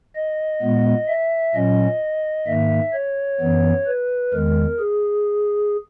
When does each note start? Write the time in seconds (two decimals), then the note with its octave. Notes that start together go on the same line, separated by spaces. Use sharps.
0.15 D#5
0.62 A#2 G#3 B3
1.08 E5
1.54 A#2 F#3 C#4 D#5
2.47 G#2 D#3 A#3 E5
2.93 C#5
3.40 F#2 E3 B3
3.86 B4
4.33 E2 D#3 G#3 A#4
4.80 G#4